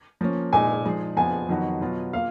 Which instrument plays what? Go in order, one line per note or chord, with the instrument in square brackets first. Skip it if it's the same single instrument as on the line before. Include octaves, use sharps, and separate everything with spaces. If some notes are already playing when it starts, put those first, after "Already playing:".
[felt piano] F3 A#3 C#4
[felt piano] A#2 G#3 D#4 [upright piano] G#5
[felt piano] F3 G#3 D#4 G#4
[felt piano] F2 F3 B3 [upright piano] G#5
[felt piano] F2 D#3 F#3 B3 F#4
B2 F#3 B3 F4
[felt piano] A#3 F4 [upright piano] F5